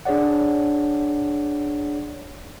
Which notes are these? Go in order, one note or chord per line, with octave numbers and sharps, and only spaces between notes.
D4 G#4 C#5 D5 F#5